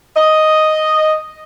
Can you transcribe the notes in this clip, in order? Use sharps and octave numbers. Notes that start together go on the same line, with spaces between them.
D#5